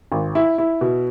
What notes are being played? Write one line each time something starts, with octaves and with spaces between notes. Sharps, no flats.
G#1
E4
E4
B2